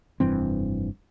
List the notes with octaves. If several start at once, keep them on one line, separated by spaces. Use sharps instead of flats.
F1 G2 E3 C4